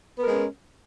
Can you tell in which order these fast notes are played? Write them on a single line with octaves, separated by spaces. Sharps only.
B3 A#4 G#3 C#4